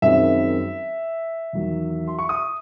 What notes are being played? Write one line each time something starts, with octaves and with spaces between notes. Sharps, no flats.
F#2 D#3 G#3 C4 E5
E2 D#3 F#3
C6
C#6
D#6